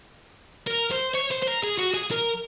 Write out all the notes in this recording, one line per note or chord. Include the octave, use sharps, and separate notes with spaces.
A#4
C5
C#5
C5
C5
A#4
G#4
F#4
G#4
A#4